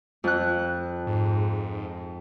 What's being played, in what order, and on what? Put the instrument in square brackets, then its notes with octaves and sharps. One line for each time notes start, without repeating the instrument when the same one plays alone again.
[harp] F2 F#6
[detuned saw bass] G#2